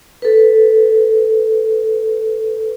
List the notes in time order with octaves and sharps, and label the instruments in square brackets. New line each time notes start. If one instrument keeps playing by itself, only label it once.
[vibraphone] A4 B4